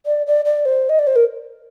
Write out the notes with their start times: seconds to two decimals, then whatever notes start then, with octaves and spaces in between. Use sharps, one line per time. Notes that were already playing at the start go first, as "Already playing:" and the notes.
0.06 D5
0.27 D5
0.45 D5
0.65 C5
0.89 D#5
0.99 D5
1.07 C5
1.16 A#4